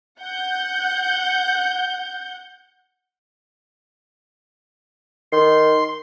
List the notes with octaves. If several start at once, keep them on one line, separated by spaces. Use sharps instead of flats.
F#5 G6
D#3 C6